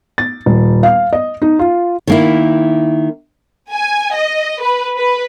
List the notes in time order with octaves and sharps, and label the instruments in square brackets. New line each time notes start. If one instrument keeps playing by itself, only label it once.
[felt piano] A6
D#1
F5
D#5
D#4
F4
[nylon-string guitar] D#3 A#3 E4
[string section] G#5
D#5
B4
B4